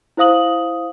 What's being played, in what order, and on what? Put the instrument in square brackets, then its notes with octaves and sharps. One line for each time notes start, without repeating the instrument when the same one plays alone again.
[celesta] E4 C5 F5 D#6 F#7